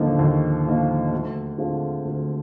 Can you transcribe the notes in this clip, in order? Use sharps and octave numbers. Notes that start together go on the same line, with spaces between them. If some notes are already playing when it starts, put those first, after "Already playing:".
Already playing: D#2 D3 F3 A#3 D#4
D#2
D3 F3 A#3 D#4
D2
D3 G#3 C4 F4
D2